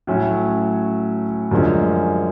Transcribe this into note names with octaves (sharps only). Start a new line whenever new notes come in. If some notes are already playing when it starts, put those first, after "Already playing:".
A2 F#3 A3 C#4
F#2 D3 F3 G#3 C#4